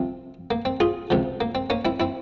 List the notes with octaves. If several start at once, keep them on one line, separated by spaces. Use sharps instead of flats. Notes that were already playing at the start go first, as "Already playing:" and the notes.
Already playing: C2 C3 F3 C4
A#3
C4
F4 G#4
C#2 C3 F3
A#3
C4
A#3 C#4
C4 E4
C4 E4